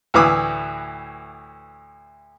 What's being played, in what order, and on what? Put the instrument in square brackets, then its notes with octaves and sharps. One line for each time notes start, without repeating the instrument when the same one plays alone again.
[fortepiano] D2 A2 E3 B4 D6 D#6